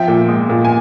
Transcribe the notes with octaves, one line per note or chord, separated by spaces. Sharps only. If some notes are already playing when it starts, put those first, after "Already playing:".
Already playing: F3 E5 G5
A#2
G#3
A#2
G#5